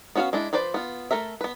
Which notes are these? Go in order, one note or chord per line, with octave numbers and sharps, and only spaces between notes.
B3 C#4 F#4 D5 F5
G#3 D4 E4
F3 B4 C5 D5
B3 F4
A3 D#4 A4 A#4 E5
B3 B4